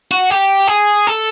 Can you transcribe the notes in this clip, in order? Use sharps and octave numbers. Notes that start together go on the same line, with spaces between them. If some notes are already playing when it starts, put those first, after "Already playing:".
F#4
G4
G#4
A4